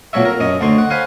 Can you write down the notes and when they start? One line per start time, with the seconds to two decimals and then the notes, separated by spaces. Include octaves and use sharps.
0.13 B1 A#2 F#3 A4 C#5 E5
0.25 A#4
0.40 F#2 C#4 D#5
0.61 D2 D3 C6 C#6
0.78 F#5
0.90 C5 F5 F#5 G#5 B5